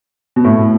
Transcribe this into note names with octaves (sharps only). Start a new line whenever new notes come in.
B2
A2